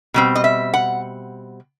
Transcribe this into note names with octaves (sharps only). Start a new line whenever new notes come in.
B2 G3 C4
D#5
E5
F#5